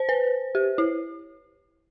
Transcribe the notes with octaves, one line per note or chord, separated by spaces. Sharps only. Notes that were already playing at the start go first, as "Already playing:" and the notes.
Already playing: C5
B4
G4
E4